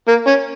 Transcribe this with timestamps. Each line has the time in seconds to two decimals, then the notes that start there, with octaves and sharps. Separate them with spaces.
0.08 A#3
0.27 C#4